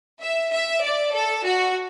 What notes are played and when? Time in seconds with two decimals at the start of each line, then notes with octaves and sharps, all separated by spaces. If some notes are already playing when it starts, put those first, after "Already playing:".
0.20 E5
0.51 E5
0.82 D5
1.13 A4
1.44 F#4